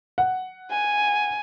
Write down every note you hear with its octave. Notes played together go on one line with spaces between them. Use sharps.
F#5
G#5